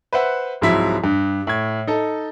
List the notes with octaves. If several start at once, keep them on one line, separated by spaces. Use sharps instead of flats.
B4 C5 E5 F#5
C2 G#2 F3 F#3 E4 B6
G2
A2 G#6
D#4 A4